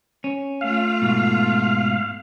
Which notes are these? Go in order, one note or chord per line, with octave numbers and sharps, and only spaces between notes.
C#4
A3 F4 F5
G#2 B2